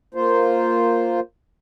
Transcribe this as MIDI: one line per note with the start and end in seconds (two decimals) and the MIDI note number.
0.14 1.20 58
0.14 1.20 65
0.14 1.20 72